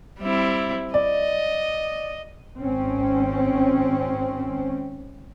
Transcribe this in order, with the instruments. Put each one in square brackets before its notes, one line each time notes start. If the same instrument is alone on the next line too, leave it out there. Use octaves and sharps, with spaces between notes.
[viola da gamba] G3 C4 E4
[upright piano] D5 [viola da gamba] D#5
[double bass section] G#1 C4 C#4